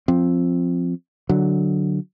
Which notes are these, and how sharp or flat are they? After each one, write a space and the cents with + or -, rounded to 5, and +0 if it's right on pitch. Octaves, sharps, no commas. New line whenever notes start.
F3 +0 C4 +0
D3 +0 F#3 +0